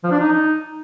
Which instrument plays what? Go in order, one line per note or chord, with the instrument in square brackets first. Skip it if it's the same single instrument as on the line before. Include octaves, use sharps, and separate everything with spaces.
[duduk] F3
D4
D#4